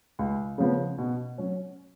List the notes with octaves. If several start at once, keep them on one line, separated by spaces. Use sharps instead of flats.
C#2
C#3 F3 B3
B2
F#3 C#4